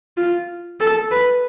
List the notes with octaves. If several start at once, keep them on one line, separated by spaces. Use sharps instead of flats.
F4
A4
B4